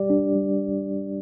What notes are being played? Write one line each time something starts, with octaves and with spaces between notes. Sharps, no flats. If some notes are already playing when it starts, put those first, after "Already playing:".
Already playing: G3 G4 D5
D4
G3